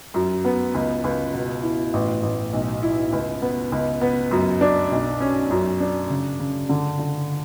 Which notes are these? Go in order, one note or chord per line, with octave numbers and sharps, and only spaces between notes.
F#2
B3
C#2
C#2
B2
E4
A1
A1
B1
E4
C#2
B3
C#2
B3
F#2
D4
B1
C#4
F#2
D4
C#3
C#3
D3
D3